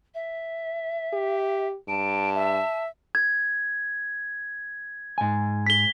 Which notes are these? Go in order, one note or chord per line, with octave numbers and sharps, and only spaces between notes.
E5
G4
G2 A5 D7
E5
G#6
G#2 G#5
B6 G7